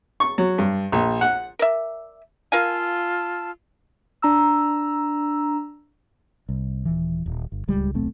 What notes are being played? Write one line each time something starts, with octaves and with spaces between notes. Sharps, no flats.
C#6
F#3
G2
A#1
F#5
A#4 D5 E5
F4 A#4 F5 G#5 A5 E6
D4 A#5 E6
C2
D#1 E3
D#1
G1
D1 C#2 G3 G#3
D#1 B1 A3 C4